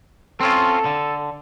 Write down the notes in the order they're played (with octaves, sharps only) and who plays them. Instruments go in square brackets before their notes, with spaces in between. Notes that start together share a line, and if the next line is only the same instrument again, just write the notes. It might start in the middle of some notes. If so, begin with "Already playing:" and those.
[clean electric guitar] C4 C#4 F4 [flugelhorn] A4
[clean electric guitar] D3